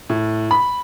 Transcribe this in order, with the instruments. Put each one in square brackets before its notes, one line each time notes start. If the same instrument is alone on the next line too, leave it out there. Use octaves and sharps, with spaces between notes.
[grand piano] A2
B5